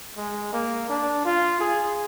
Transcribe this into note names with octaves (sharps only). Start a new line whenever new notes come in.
G#3
A#3
D4
F4
G#4